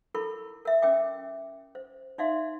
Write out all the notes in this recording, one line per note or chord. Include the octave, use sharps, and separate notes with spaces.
E4 A4 A#4 B5 C#6
A#4 E5
C#4 A#4 E5 G5 D6
C5
D#4 D5 E5 F5 C6